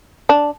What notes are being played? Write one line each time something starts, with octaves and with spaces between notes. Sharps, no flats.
D4